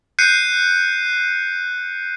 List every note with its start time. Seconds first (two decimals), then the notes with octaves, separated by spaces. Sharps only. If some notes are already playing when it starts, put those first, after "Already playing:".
0.19 F#6 G6 C7 C#7 D#7